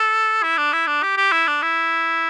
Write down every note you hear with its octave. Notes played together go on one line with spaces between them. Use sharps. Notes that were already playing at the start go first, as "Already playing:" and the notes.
Already playing: A4
E4
D4
E4
D4
G4
G4
E4
D4
E4